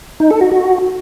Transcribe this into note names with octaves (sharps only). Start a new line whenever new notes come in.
D#4
A4
F#4
F#4